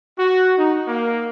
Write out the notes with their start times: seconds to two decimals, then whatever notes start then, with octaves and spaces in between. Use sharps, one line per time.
0.19 F#4
0.57 D#4
0.87 A#3